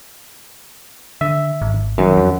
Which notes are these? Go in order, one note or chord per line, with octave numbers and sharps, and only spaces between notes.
D3 E5
G#1
F#2 D#3
F2